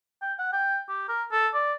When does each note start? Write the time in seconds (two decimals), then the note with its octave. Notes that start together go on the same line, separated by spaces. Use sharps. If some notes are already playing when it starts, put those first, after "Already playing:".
0.22 G5
0.39 F#5
0.53 G5
0.89 G4
1.09 A#4
1.32 A4
1.54 D5